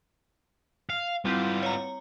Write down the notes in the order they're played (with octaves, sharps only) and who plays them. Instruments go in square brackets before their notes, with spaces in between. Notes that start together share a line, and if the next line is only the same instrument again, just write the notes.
[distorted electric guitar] F5
[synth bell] G3 C4 E4 [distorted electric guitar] B3 F4
[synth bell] C#5 A#5